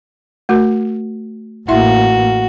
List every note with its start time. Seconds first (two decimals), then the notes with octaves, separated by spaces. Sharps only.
0.49 A3 F#4 A#4
1.68 A1 A#3 E4 F#4 E5 C6